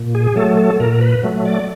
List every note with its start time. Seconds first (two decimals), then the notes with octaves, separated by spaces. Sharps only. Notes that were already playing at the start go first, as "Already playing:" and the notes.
Already playing: A#2
0.15 G#4
0.35 F#3 A3 A4
0.57 A4
0.80 A#2 A#4
1.01 B4
1.23 F#3 A3
1.45 D5